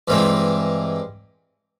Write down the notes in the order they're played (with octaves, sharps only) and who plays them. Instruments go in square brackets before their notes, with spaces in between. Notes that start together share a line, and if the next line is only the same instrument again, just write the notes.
[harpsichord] G2 E3 G#3 C4